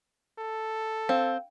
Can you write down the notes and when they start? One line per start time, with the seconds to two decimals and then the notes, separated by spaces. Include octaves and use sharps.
0.39 A4
1.09 C4 F5